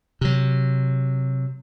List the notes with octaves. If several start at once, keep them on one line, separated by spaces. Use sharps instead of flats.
C3 F#3